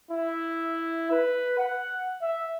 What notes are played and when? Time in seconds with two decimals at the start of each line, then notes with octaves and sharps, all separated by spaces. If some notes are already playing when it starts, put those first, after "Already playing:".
0.11 E4
1.11 B4
1.58 F#5
2.22 E5